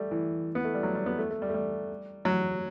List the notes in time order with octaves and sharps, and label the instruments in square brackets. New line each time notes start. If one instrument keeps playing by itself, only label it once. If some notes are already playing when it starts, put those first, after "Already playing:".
Already playing: [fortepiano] G3 A3
E3
B3
A3
G3
F#3
G3
B3
A3
A3
G3
A3
G3
F#3